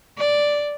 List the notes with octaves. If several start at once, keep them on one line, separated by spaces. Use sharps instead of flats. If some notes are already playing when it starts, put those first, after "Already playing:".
D5